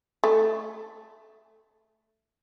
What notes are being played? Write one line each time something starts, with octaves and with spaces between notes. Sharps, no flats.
A3